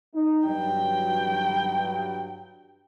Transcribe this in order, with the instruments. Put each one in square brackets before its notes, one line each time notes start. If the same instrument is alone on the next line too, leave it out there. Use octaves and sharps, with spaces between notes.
[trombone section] D#4
[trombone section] G2 F#3 [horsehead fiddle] G5